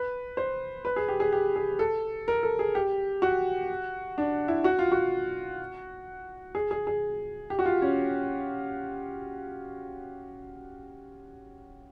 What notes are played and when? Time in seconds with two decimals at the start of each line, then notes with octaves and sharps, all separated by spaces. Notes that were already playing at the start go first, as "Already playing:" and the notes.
Already playing: B4
0.37 C5
0.85 B4
0.96 G#4
1.08 G4
1.20 G#4
1.32 G4
1.56 G#4
1.79 A4
2.28 A#4
2.43 A4
2.59 G#4
2.75 G4
3.22 F#4
4.18 D4
4.48 E4
4.64 F#4
4.79 F4
4.92 F#4
6.55 G#4
6.71 G#4
6.87 G#4
7.50 G4
7.59 F#4
7.66 F4
7.82 C#4